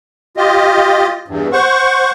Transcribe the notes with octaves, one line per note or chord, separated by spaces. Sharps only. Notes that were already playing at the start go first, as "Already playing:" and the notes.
F4 G4 D#5
E2 G2
C5 F#5 C#6